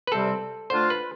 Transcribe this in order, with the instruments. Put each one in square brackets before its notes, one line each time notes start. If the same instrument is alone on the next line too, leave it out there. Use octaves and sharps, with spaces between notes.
[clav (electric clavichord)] B4
[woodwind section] C3 G3 C4 [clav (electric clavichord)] A4
[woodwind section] D3 A3 D4 F4 [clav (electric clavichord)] C5
[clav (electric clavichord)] B4